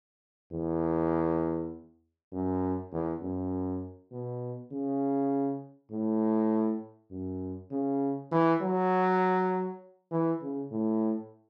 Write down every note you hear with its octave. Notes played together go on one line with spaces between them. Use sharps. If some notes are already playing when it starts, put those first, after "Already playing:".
E2
F#2
E2
F#2
B2
C#3
A2
F#2
C#3
E3
F#3
E3
C#3
A2